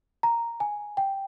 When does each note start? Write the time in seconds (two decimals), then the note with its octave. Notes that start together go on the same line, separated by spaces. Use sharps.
0.23 A#5
0.60 G#5
0.97 G5